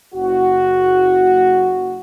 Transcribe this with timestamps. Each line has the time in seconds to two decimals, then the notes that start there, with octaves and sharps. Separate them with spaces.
0.14 F#1 F#4